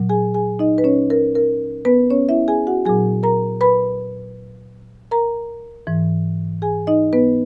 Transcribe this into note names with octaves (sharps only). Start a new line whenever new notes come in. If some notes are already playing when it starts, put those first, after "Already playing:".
Already playing: A#2 F#3
G#4 G#5
G#4 G#5
D#4 D#5
B4
C#4 C#5
A#4
A#4
B3 B4
C#4 C#5
E4 E5
G#4 G#5
F#4 F#5
A#2 F#3 G#4 G#5
A#4 A#5
B4 B5
A#4 A#5
G#2 E3
G#4 G#5
D#4 D#5
B3 B4